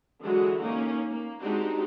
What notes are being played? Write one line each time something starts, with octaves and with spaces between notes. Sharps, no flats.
D3 E3 F#3 G#3 F#4
A#3 C#4 D#4
A#3
G#3 C4 D4 D#4 F#4 G4